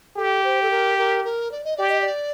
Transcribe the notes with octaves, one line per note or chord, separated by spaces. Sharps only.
G4 A4
C5
A4
A#4
A#4
A#4
D5
D#5
G4 D5
D#5
D5